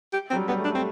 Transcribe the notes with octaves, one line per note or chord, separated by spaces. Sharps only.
G4
F#3 C4
G3
G3 B3
A3
D4
A3 C4